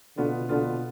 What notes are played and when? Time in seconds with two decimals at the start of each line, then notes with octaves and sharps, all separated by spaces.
0.17 B2 D3 B3 F4
0.49 B2 D3 B3 F4